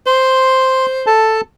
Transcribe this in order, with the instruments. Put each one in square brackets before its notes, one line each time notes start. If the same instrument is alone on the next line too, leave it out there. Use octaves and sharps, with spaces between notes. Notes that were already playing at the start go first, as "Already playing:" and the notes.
[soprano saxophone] C5 [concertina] C6
[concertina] A4 A5